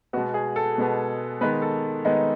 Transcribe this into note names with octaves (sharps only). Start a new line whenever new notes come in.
B2 G#3 B3 F#4
G#4
A4
B2 G#3 B3
D#3 G#3 B3 B4
A4
D#3 G#3 B3 D#4